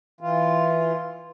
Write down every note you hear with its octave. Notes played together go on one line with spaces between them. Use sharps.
E3 F4